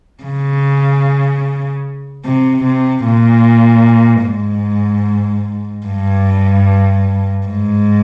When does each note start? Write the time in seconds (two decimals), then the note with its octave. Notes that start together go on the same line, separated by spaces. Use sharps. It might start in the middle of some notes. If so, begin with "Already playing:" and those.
0.24 C#3
2.25 C3
2.64 C3
3.05 A#2
4.25 G#2
5.86 G2
7.47 G#2